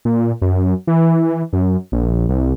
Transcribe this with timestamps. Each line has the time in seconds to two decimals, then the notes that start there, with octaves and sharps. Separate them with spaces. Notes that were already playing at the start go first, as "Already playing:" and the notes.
0.05 A#2
0.41 F#2
0.87 E3
1.53 F#2
1.92 A#1
2.29 C2